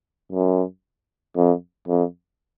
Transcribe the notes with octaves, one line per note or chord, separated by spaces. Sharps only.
F#2
F2
F2